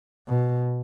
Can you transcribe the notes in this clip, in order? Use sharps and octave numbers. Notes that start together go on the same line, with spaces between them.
B2